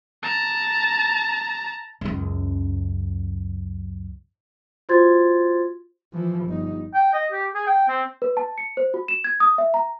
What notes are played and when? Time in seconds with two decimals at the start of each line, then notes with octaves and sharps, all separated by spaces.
0.23 A5 A#5
2.01 C#2 F#2
4.89 F4 F#4 C5 C6 G#6 A6
6.13 E3 F3
6.45 G1 D#4
6.94 G5
7.13 D#5
7.31 G4
7.54 G#4
7.67 G5
7.88 C4
8.22 B4
8.37 A5
8.58 C#7
8.77 C5
8.94 F#4
9.08 E7
9.24 G#6
9.40 D#6
9.58 E5
9.74 A#5